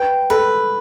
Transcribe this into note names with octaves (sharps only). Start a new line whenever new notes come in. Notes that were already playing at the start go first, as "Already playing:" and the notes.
Already playing: B4 G5
A4 B4